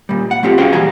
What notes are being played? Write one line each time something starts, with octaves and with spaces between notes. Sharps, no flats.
A#2 G3
F#5
F#3 A3 C4 F4 G4
C#4 F#4 G#4 C5 F5 G5
A#2 E3 G3 G#5 A#5